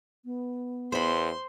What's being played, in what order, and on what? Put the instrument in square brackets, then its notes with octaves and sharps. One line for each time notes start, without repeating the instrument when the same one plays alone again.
[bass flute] B3
[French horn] E2 [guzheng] C5 B5 [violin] C6